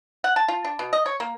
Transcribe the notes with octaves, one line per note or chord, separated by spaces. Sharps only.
F#5
A5
F4
D4
B2
D#5
C#5
A#3